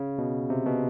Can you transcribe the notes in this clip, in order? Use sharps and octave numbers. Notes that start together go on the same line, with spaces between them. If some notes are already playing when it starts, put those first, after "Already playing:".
Already playing: C#3
B2
C3
B2